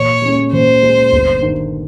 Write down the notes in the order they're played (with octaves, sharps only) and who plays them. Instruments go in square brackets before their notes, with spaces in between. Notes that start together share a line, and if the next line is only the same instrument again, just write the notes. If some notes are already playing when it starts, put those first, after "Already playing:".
Already playing: [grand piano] A#2 [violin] C#5
[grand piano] G#3 C#4
[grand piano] A#2 [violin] C5
[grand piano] G#3 C#4
G1
G2 D#3